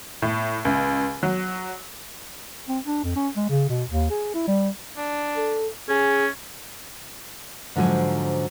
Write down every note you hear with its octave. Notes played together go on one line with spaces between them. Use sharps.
A2
C#2
F#3
C4
D4
F2
C#4
G#3
C#3
B2
D#2
G#4
E4
G3
D4
A4
C#4 G#4
G#2 D3 F3 F#3 C5 G#5